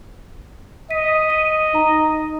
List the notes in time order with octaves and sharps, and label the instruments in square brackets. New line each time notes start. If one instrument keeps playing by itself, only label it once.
[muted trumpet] D#5 [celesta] B6 D#7
[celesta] D#7
D#4 A#5